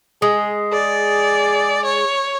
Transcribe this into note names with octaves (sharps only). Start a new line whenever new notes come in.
G#3 G#4
G#4 D5
C#5